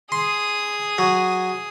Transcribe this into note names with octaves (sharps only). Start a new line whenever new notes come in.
G#4 C6 D#6
F#3